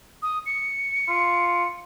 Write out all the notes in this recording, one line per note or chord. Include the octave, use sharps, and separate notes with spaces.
D#6
C#7
F4